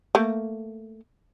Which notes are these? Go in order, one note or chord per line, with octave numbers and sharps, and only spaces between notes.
A3 A#3